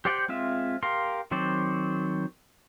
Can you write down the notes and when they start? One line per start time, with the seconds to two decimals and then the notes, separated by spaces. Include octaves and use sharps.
0.05 G4 C5 D5 F#5 G5
0.28 G#3 C4 F4 E5
0.83 G4 A#4 F5 C6
1.31 D#3 F#3 C4 C5 D5